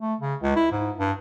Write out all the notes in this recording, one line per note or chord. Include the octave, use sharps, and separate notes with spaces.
A3
C#3
C#2
E4
G#2
G2